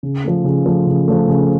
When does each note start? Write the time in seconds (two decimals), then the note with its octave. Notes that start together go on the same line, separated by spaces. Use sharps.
0.03 C#3
0.24 F3 A3
0.44 C#3
0.66 F3 A3
0.87 C#3
1.08 F3 A3
1.28 C#3